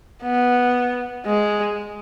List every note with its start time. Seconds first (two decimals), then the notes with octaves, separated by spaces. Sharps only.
0.23 B3
1.26 G#3